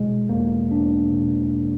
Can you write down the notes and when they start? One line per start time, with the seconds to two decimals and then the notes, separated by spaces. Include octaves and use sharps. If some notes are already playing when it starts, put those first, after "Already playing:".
Already playing: B2 G#3
0.29 E2 A#3
0.71 E2 D4
1.11 B2